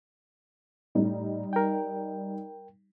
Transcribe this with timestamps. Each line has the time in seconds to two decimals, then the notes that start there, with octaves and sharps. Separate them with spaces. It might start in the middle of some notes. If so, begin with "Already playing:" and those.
0.95 A2 G3 D#4
1.53 A#4 G5